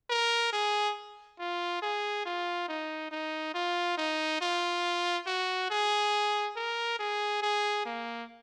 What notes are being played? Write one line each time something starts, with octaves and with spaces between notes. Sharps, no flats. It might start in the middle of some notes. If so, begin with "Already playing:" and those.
A#4
G#4
F4
G#4
F4
D#4
D#4
F4
D#4
F4
F#4
G#4
A#4
G#4
G#4
A#3